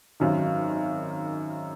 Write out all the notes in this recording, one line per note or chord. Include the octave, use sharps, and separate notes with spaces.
G#1 F#2 D#3